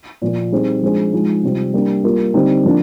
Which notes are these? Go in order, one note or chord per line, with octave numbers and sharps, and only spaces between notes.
A#2 F3 A#3
G3 C4 D#4 G#4 C5
F3 G#3 D4 G#4 C5
F3 G#3 D#4
C3 G3 C4 F4
G3 A#3 D4 G4
G3 A#3 F4 A#4
D3 G3 C4 D#4
F3 A#3 D4